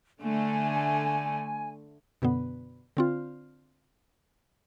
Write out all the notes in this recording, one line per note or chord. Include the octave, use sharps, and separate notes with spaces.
D3 A3 G#5
F#2 B2 D3 B3
D3 C4 F4